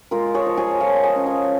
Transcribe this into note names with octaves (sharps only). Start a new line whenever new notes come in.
G#3 F4 A#4
G#4 C#5
F3
G#4 C#5
F3 C#5 F5
D#5 G#5
C#4
D#5 G#5